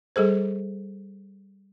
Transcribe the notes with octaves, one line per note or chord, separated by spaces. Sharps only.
G3 G#4 A4 C5